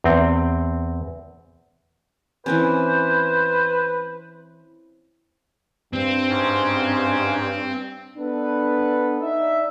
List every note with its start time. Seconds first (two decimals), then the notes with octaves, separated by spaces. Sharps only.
0.04 E2 C4
2.46 E3 C4 C#4 B4 C5
5.93 G2 C4
6.29 G#2 C#4
8.17 B3 D4 A4 B4
9.22 D#4 D5 E5